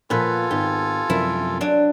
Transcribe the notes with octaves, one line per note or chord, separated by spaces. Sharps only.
A#2 F3 B3 F4 A4 B4 G#5
G#1 G4
F#2 C3 F3 E4 A#4
F#3 D4